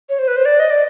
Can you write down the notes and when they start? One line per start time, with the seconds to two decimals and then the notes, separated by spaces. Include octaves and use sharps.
0.09 C#5
0.19 C5
0.28 B4
0.36 C5
0.45 D5
0.59 D#5
0.70 D5